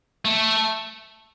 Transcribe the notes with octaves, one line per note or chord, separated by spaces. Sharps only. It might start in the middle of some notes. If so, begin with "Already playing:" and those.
A3